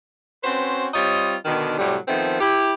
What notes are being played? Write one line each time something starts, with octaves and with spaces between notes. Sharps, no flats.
C4 C#4 F#4 B4 C5
G3 C4 F4 C#5 D#5
B2 D3 D#3
A2 C3 F#3 G3
D#3 F3 A3 B3 C4
E4 G4